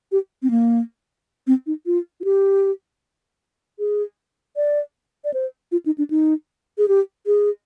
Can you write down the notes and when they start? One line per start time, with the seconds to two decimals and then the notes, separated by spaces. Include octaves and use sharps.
0.12 G4
0.43 C4
0.50 A#3
1.47 C4
1.67 D#4
1.86 F4
2.20 F4
2.24 G4
3.79 G#4
4.56 D5
5.24 D5
5.34 C5
5.72 F4
5.86 D#4
5.98 D4
6.10 D#4
6.78 G#4
6.88 G4
7.27 G#4